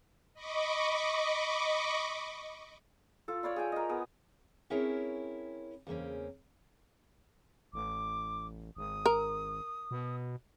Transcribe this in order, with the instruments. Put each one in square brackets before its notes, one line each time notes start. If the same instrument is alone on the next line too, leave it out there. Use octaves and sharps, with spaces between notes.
[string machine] D#5 B5 C#6 D6
[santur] F4 A4
C#5 D5 F5 B5
G#4 G5 G#5
A#4 D#5
B3 G#4
[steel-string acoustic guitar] C4 C#4 E4 G#4 A#4 C#5
E2 C#3 A#3 C4 C#4
[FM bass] A1 [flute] D6
[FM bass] G#1 [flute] D#6
[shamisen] A#4
[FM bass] B2